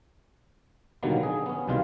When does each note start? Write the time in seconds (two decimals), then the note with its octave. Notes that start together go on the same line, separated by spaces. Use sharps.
1.03 B2 D3 D#3 F#3 G3 A#3
1.23 G#4
1.46 B3 C#4
1.67 C2 B2 D#3 G3 F4 F5